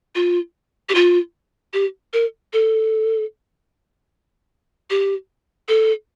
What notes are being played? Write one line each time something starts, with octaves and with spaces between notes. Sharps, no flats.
F4
G4
F4
G4
A#4
A4
G4
A4